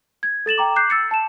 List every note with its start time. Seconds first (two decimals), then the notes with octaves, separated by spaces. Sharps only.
0.23 G#6
0.46 A4 A6 E7 F#7
0.58 G5 A#5 D6
0.76 D6 F#6 G6 C7
0.90 E6 A6 C#7
1.11 A5 E7